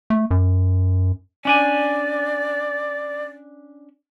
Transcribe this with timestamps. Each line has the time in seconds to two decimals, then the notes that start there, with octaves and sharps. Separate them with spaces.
0.10 A3
0.31 F#2
1.45 C#4 D4 D5 G#5